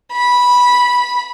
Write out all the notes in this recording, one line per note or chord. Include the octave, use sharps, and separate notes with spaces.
B5